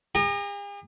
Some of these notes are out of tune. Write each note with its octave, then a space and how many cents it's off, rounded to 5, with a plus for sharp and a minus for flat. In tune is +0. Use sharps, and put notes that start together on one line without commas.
G#4 -45 A#5 +0